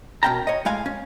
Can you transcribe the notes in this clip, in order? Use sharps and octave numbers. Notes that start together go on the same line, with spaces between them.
B2 C#4 A#4 G5 A5 A#5
C#5 D#5
A2 G#3 F5 G#5
C#4